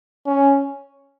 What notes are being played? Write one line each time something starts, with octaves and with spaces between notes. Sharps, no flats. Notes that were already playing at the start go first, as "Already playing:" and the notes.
C#4